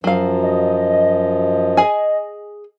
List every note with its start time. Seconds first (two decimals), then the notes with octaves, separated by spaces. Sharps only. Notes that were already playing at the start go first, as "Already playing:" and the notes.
0.04 F#2 F3 F#3 F5
0.43 D#5
1.77 G#4 G#5